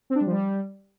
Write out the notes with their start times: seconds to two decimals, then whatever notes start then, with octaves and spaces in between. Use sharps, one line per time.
0.10 C4
0.15 D4
0.21 G3
0.26 F3
0.32 G3